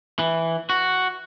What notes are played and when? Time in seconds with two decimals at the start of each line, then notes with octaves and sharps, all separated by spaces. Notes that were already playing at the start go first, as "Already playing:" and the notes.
0.19 E3
0.69 F#4